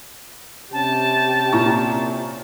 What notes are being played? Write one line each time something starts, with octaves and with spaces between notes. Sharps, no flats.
C3 C#4 G4 A5
A#2 A#5 C#6